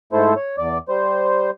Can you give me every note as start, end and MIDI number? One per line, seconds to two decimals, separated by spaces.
0.13 0.34 44
0.13 0.34 57
0.13 0.34 64
0.13 0.34 69
0.13 0.34 72
0.36 0.56 73
0.58 0.78 40
0.58 0.78 74
0.89 1.50 55
0.89 1.50 72